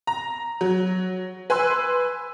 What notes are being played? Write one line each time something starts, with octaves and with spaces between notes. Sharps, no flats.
A#5
F#3
B4 G#5 C6 E6